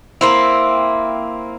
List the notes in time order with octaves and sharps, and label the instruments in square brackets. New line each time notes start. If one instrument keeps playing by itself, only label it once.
[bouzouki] A#3 C4 E4